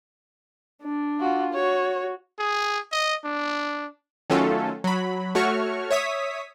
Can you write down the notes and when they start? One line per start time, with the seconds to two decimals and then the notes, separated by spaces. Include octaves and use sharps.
0.83 D4
1.20 F4 F#4
1.54 F#4 C#5
2.39 G#4
2.92 D#5
3.25 D4
4.30 D#3 F#3 A3 C#4 F4 A4
4.84 F#3 B5
5.35 A3 F#4 C#5 C#6 F6
5.91 C#5 E5 D#6 B6